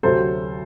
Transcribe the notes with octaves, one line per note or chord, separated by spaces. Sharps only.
D2 C3 F#3 A4 C5